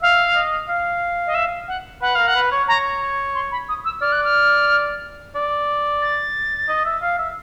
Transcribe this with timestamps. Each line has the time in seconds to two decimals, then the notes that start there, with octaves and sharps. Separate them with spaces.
0.02 E5 F5
0.35 D#5
0.69 F5
1.27 D#5
1.35 E5
1.68 F#5
2.02 B4 F#5
2.15 A#4 F5
2.28 F#5
2.35 B4
2.52 C#5
2.68 C#5 A#5
3.35 C6
3.52 B5
3.69 D#6
3.85 E6
4.01 D5 F6
4.12 F#6
4.24 F6
5.35 D5
6.02 A6
6.69 D#5
6.85 E5
7.02 F5
7.18 E5